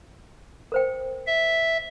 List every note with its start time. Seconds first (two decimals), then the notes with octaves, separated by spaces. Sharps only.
0.72 A#4 C5 G5
1.27 E5